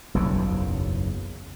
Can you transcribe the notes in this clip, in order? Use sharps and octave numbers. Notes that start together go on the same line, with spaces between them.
F#1 B1 E2 C#3